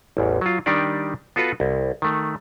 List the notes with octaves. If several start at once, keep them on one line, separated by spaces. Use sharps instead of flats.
A1 E2
F#3 F4
D#3 G3 D4 D#4 G4 D5
B3 F4 F#4 A4 B4
C2
D#3 A3